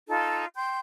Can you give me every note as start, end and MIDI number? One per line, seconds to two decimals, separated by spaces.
0.08 0.45 63
0.08 0.45 65
0.08 0.45 69
0.55 0.79 79
0.55 0.79 84
0.55 0.79 91